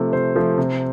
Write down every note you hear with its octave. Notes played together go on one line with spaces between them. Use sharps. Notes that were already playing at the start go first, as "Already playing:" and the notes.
Already playing: C3 F3 A3
C3 C5
F3 A3
C3